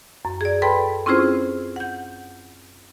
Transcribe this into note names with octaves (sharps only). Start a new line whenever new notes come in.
F#2
G#4 D5
A4 B4 G5 A5 B5 C6
C4 C#4 E4 F4 G#4 C5
F#5 G6